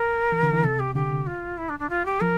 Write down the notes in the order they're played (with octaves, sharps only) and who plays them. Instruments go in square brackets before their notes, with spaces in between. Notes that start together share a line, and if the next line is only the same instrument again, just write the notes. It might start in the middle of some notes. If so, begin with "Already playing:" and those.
Already playing: [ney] A#4
[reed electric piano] E3
D3
E3
[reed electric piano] C3 [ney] A4
[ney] G4
[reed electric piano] D3 [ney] G4
[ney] F4
E4
D4
D4
F4
G4
[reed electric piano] F3 [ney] A#4